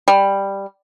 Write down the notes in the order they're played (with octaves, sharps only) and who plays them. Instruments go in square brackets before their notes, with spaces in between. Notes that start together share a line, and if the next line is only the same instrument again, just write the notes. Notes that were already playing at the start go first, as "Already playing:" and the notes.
[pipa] G3